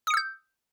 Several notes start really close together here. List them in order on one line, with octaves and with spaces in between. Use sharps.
D#6 C#7 E6 G6